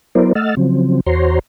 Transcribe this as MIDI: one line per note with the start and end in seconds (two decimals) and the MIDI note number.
0.15 0.33 54
0.15 0.33 59
0.15 0.33 64
0.15 0.33 70
0.15 0.33 72
0.15 0.33 74
0.35 0.55 57
0.35 0.55 75
0.35 0.55 78
0.35 0.55 88
0.35 0.55 89
0.35 0.55 93
0.57 1.00 49
0.57 1.00 53
0.57 1.00 54
0.57 1.00 60
1.06 1.39 40
1.06 1.39 66
1.06 1.39 72
1.06 1.39 73
1.06 1.39 82
1.06 1.39 84